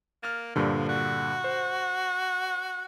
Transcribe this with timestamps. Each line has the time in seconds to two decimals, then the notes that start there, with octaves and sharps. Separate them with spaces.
0.23 A#3 F6 A6
0.56 G2 A#2 D3 F3
0.89 F#4
1.44 C5